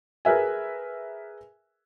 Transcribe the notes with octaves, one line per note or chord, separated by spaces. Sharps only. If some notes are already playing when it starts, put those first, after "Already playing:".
G#4 A#4 B4 E5 G#5